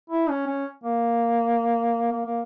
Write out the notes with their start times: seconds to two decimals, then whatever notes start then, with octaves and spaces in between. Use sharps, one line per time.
0.10 E4
0.29 C#4
0.46 C#4
0.84 A#3
2.12 A#3
2.26 A#3